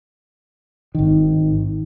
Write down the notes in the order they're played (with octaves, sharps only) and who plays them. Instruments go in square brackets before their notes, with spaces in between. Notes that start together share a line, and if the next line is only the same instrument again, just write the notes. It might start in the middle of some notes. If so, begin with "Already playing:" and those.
[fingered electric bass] G#1 D#3